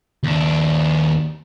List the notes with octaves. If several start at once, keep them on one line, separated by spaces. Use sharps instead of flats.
D#2 D4